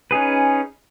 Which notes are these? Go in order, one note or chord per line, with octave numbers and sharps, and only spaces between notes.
C#4 D#4 G#4 B4